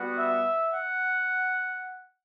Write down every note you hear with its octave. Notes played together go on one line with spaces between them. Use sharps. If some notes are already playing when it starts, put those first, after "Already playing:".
Already playing: G3 B3 F#4
E5
F#5